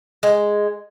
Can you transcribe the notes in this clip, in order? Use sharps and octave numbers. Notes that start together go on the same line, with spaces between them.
G#3